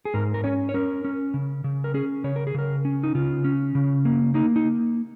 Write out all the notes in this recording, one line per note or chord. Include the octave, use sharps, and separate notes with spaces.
G#4
G#2 A#4
A#4
C#4 C#5
C#5
C#4 A#4
C#4
C#3
C#3
A#4
C#4 G#4
C#3 C#5
A#4
G#4
C#3 A#4
C#4
D#4
C#3 F4
C#4
C#3
A#3
A#3 D#4
D#4